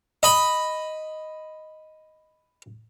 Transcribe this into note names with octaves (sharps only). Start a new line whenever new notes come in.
D#5 B5